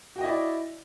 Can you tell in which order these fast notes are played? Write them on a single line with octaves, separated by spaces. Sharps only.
F#4 G5 D#5 E4 D5